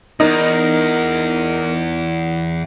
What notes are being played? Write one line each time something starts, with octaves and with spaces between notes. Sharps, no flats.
E2 D#4 A#4